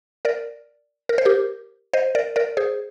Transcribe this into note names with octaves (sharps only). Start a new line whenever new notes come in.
A#4 D5
A#4
C5
G4 A#4
C5 D#5
A#4 D5
A#4 D5
G#4 C5